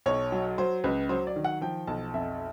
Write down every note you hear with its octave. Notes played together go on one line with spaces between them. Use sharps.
B1 C#5
F#3
F#3 C5
C#2 B4
F#3 C5
D5
D#3
F#5
F3 G5
B1 A5
F2 E5